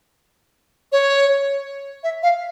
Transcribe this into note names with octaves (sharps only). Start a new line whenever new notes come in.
C#5
E5
F5